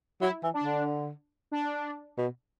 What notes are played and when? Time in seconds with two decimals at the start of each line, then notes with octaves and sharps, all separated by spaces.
0.21 F#3 E4
0.43 E3
0.54 D4
0.64 D3
1.52 D4
2.18 B2